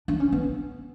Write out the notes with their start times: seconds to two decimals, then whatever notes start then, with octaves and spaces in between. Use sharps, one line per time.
0.08 D4
0.20 C#4
0.32 B3